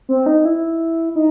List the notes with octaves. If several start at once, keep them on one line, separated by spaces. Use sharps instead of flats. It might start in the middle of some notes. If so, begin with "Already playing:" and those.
C4
D#4
E4
D#4